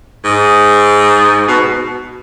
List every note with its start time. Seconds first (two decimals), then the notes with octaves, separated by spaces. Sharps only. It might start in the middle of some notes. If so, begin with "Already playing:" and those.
0.23 G#2
1.46 B2